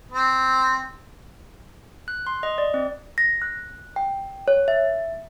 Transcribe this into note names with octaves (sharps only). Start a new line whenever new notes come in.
C4
F#6
C6
D#5
D5
C4
A#6
F#6
G5
C#5
E5